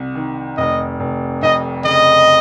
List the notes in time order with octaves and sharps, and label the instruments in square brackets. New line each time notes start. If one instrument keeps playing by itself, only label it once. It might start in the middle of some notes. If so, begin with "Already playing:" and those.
Already playing: [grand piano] C2
D#3
[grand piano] F1 [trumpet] D#5
[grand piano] F1
[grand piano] F2 [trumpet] D#5
[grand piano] C#3 [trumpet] D#5